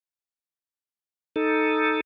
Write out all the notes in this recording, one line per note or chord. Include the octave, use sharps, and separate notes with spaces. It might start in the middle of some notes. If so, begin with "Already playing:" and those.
D#4 A4